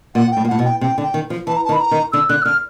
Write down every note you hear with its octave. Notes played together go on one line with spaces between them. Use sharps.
A#2 F#5
G5
A2
A#2
A2 F#5
B2
G5
C3 G5
D3
G5
D#3
F3
E3 A5
A#5
D#3 A5
B5
A#5
D#3
D3 E6
D3 F#6
E6
D3 F6